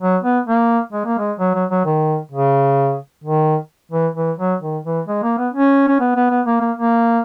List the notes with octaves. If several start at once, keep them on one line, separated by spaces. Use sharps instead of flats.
F#3
B3
A#3
G#3
A#3
G#3
F#3
F#3
F#3
D#3
C#3
D#3
E3
E3
F#3
D#3
E3
G#3
A#3
B3
C#4
C#4
B3
B3
B3
A#3
A#3
A#3